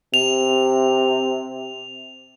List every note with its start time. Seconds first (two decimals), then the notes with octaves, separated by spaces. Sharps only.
0.14 C3 F7